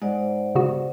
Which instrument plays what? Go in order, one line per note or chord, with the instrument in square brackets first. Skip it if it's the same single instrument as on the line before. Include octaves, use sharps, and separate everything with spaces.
[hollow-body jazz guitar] G#2 [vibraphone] C5 D5 F#5
[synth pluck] C#3 B3 F#4